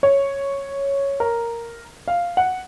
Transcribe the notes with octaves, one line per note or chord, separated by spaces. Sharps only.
C#5
A#4
F5
F#5